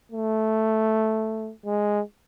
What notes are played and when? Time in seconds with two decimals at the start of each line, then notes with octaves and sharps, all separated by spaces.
0.12 A3
1.66 G#3